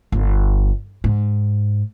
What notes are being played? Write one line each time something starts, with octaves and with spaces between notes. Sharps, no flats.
G1
G#2